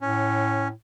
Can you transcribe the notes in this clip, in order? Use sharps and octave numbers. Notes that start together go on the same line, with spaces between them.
A2 C#4